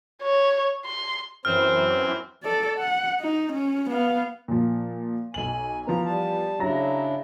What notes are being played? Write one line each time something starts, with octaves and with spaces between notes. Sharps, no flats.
C#5
C6
F#2 E3 C4 C5 F6
A4 D5
F#5
D#4
C#4
B3 F5
A#2 F3
B1 G#5 F#7
E3 F3 B3 A#5
G3 A5
C#3 F#3 D4 E4 A#5 A#6